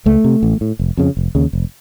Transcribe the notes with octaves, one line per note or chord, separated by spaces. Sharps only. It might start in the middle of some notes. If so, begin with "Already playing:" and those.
C#2 A3
C3
A1
A2
F1
F2 C#3
F1
D#2 C#3
F1